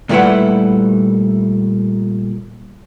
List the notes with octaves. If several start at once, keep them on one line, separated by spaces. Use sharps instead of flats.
A#2 G3 A3 E4 B4 F#5